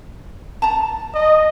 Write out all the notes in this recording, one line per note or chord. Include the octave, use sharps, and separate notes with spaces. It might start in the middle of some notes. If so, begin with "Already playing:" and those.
A5 A#5
D#5